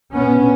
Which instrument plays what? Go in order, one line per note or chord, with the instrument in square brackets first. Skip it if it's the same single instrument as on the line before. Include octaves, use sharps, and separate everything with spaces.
[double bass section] A#2 B3 C#4